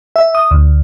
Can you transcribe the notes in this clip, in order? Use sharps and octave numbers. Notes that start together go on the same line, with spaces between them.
E5
D#6
D2